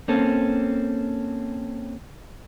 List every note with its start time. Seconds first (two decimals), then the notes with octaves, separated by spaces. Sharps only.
0.08 A#3 C4 C#4 A4